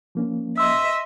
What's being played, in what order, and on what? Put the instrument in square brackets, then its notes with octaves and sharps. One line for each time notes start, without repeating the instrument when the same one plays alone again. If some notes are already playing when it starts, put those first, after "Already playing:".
[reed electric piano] F3 A#3 C#4
[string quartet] D#5 E5 [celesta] C6 E6